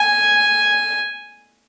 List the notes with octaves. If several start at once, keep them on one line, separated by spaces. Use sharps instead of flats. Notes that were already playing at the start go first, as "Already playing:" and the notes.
Already playing: G#5